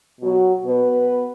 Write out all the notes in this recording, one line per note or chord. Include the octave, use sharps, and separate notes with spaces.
B2 F#3 F#4
B2 B3 B4